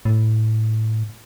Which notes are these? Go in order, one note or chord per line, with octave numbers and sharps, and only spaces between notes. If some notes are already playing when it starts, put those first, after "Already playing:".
A2